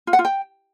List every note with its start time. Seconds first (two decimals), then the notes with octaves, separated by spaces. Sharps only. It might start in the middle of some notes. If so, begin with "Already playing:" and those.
0.07 F4
0.13 F#5
0.19 F4
0.25 G5